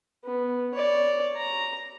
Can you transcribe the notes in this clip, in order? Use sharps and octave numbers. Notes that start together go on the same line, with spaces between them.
B3
C#5 D5
A#5